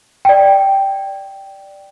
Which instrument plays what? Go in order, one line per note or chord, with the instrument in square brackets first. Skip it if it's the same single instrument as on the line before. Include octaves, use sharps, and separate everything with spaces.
[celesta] D5 G5